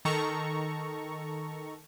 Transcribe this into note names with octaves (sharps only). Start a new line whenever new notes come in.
D#3 A4 A#5 C#6